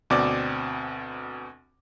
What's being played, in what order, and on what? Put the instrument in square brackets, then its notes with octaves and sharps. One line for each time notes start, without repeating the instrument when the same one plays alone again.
[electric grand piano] D2 B2 C4 D5 D6